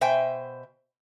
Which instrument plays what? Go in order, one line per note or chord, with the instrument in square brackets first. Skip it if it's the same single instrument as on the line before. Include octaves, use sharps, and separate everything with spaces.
[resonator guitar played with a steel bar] B2 C5 E5 G5 G#5